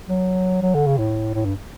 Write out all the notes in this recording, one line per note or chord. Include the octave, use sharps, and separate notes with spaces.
F#3
F#3
D3
C#3
A2
A2
G2